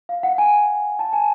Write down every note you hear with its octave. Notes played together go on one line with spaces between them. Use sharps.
F5
F#5
G#5
A5
G#5